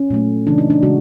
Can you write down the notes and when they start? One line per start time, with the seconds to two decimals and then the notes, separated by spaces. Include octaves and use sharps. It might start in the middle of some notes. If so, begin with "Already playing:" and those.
Already playing: C#4
0.10 A#2 F#3 A3
0.47 C#3 E3 G#3 D4
0.58 D#4
0.70 D4
0.83 C#3 E3 G#3 F#4